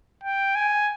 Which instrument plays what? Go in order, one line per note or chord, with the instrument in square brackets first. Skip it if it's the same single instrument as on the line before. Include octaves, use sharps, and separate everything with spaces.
[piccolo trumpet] G5
G#5